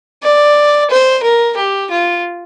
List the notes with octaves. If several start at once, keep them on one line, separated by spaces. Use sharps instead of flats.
D5
C5
A#4
G4
F4